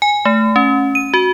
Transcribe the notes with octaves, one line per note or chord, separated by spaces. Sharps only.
G#5
A3
C#4
D#7
F#4